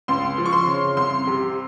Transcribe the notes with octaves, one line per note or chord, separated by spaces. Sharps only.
C#2 C6
F3
C#6
C6
C#3
C2 C6
C3